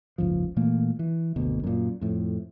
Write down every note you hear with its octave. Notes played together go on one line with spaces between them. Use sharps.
F#1 C#2 G#2 F3
A#2 E3 A3 A#3
E3
F#1 D2 B2
F#2 A#2
F2 A2